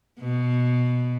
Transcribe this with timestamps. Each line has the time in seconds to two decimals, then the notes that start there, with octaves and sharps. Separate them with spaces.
0.20 B2